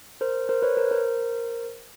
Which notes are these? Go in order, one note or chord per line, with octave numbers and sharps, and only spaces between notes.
A#4 C5
A#4 C5
B4 C#5
A#4 C5
A#4 C5